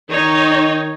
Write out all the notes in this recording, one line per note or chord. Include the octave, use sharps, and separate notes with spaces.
D#3 D#4 C#5